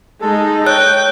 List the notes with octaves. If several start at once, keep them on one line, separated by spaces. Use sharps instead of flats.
G#3 D#4 A4
C#5 G5 F#6